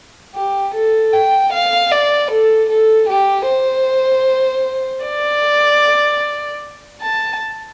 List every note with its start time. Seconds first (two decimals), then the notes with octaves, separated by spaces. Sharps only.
0.35 G4
0.75 A4
1.13 G5
1.53 F5
1.91 D5
2.31 A4
2.70 A4
3.09 G4
3.48 C5
5.06 D5
7.01 A5